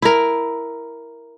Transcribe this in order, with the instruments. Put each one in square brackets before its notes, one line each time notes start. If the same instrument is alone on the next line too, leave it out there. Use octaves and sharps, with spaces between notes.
[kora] E4 A#4